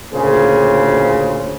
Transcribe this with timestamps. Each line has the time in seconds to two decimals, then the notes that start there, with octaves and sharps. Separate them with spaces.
0.12 D2 A#2 C#3 G#4 C5